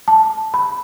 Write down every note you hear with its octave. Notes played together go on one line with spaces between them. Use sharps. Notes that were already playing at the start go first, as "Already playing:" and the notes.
A5
B5